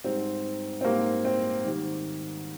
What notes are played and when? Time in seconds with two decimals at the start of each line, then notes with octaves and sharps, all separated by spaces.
0.04 G#2 G3 C4
0.81 C4
0.84 G#2 G3 A#3
1.25 C4
1.65 G#2 D#3 G3